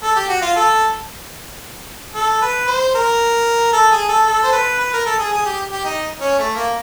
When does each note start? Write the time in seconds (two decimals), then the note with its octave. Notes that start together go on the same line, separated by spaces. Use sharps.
0.03 A4
0.16 G4
0.29 F#4
0.42 F4
0.56 A4
2.14 A4
2.41 B4
2.68 C5
2.94 A#4
3.73 A4
3.91 G#4
4.09 A4
4.27 A4
4.44 C5
4.53 B4
4.80 B4
4.93 A#4
5.06 A4
5.18 G#4
5.32 G#4
5.45 G4
5.72 G4
5.85 D#4
6.21 C#4
6.39 A3
6.55 A#3